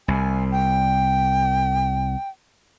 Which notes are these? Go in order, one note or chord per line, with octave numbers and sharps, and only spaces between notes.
C2 G#5
G5